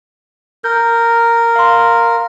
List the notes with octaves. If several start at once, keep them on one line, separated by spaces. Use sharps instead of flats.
A#4 G6
F5 C6